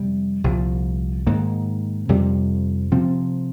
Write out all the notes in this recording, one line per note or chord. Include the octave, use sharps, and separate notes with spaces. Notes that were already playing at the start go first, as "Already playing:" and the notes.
Already playing: F2 C3 G3
C2 A#2 F3
G#2 D#3 A#3
F2 C3 G3
C3 F3 C4